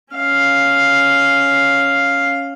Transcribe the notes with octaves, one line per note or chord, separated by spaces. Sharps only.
C#4 F5